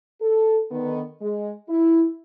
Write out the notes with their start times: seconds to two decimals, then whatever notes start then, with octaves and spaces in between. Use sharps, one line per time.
0.21 A4
0.71 D3 D#3 B3
1.21 G#3
1.69 E4